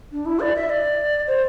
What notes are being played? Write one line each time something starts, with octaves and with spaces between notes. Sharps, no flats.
D4
E4
D5
E5
D5
C5